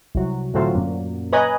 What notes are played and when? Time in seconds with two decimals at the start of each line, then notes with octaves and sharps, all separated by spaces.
0.15 C2 F#3
0.54 A2 D3 F#3 C4 F4
0.75 F#2 A#2
1.33 B4 C#5 D#5 G#5 A#5 F#6